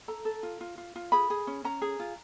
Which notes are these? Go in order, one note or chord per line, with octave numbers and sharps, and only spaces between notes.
A4 A#5
A4
F4
F4
F4
F4
G#4 B5
G#4
C#4
C#4 A#5
G#4
F4